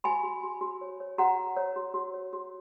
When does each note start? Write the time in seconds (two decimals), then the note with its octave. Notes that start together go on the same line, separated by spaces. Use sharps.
0.04 F#4 G#5 B5
0.23 F#4
0.43 F#4
0.61 F#4
0.81 C#5
1.00 C#5
1.18 F#4 F#5 A#5
1.38 F#4
1.57 C#5
1.76 F#4
1.94 F#4
2.14 C#5
2.33 F#4